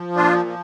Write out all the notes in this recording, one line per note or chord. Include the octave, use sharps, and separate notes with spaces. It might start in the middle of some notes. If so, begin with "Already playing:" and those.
Already playing: F3
A#2 D4 F4
F3